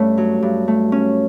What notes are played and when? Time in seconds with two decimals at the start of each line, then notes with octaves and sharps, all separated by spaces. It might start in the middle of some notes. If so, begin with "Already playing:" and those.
Already playing: G2 A3 C#4
0.18 F#3
0.43 G2
0.68 A3
0.92 C#4